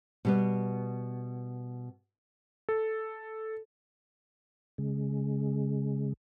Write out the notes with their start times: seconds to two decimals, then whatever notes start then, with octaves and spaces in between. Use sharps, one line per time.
0.25 B2 G3 B3
2.69 A4
4.78 C#3 G#3